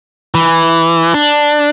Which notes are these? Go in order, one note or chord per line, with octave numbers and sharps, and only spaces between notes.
E3
D4